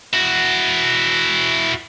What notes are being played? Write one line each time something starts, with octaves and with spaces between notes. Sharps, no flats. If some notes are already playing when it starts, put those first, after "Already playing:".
E4 F#4